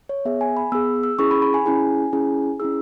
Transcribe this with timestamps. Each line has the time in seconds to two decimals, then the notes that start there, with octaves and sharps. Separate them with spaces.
0.09 C#5
0.25 B3 G#4 E5
0.41 G#5
0.57 B5
0.72 B3 G#4 E6
1.03 E6
1.19 C#4 E4 G#4 C#6
1.31 B5
1.42 B5
1.54 G#5
1.66 C#4 E4 G#4 G#5
2.13 C#4 E4 G#4
2.60 C#4 E4 G#4 E6